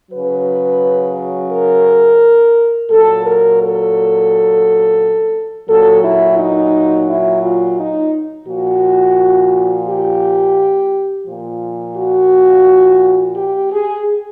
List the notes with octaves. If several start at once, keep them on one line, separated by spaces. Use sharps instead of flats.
C#3 F#3 B4
A#4
A#2 F#3 A4
A#4
A4
A#2 F#3 A4
E4
D#4
E4
F4
D#4
A#2 F3 F#4
G4
A#2 F3
F#4
G4
G#4